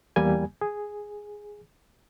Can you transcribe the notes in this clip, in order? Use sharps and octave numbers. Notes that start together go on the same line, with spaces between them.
E2 G3 A#3 G#5
G#4